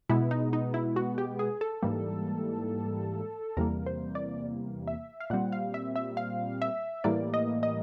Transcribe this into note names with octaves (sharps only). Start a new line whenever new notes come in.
B2 G#3 B3 E4
D#4
D#4
E4
F#4
G4
G#4
A4
G#2 E3 G3 A#3
E2 C3 E3 G3 A#3 A#4
C5
D5
E5
F5
A#2 G3 C4 F#5
F5
E5
E5
F5
E5
A2 E3 G3 A#3 D5
D#5
D#5